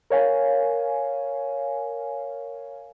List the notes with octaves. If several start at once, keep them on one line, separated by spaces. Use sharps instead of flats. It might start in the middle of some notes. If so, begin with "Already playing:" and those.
A#4 C#5 F5 G#5